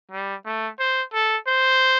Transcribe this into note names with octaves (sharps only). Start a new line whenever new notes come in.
G3
A3
C5
A4
C5